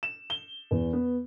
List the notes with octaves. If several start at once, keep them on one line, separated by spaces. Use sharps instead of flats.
E7
G7
E2
B3